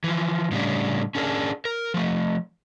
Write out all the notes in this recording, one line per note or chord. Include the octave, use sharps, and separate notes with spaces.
E3 F3
A2 C#3 G3 D4
C#4 D4 G#4 A#4
A#4
F3 A3